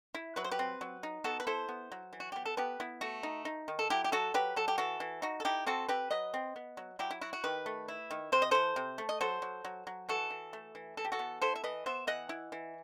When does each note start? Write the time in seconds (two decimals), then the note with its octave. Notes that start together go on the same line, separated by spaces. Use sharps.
0.15 E4
0.36 F#3 B4
0.44 C5
0.51 G4 B4
0.59 C4
0.81 F#3
1.03 D#4
1.24 B3 F#4 A4
1.40 B4
1.47 E4 A4 C5
1.69 B3
1.92 F#3
2.13 E3
2.20 F#4
2.32 B3 G4
2.45 A4
2.57 B3 G4 B4
2.80 B3 E4
3.01 A3 F#4
3.23 D#4
3.45 D#4
3.68 D#3
3.79 A4
3.90 F#3 E4 G4
4.04 G4
4.12 F#3 F#4 A4
4.34 F#3 G4 B4
4.56 F#3 A4
4.68 G4
4.78 E3 F#4 A4
5.00 E3
5.22 D#4 F#4
5.40 A4
5.45 D#4 E4 G4
5.66 C4 F#4 A4
5.88 C4 G4 B4
6.11 F#3 B4 D#5
6.34 C4
6.56 B3
6.77 F#3
6.99 F#3 E4 G4
7.11 E4
7.21 E4 F#4
7.33 F#4
7.44 D#3 G4 B4
7.66 A3
7.88 E4
8.11 D#3
8.32 C3 C5
8.42 D#5
8.51 E3 A4 C5
8.76 C3
8.98 A3
9.09 D#5
9.21 F#3 A4 C5
9.42 F#3
9.65 F#3
9.87 F#3
10.09 E3 F#4 A4
10.30 E3
10.53 A3
10.75 E3
10.97 E3 A4
11.05 G4
11.12 F#4 A4
11.19 B3
11.42 E4 A4 C5
11.56 E5
11.64 E3 B4 D#5
11.86 B3 C5 E5
12.07 E3 D#5 F#5
12.29 E4
12.52 E3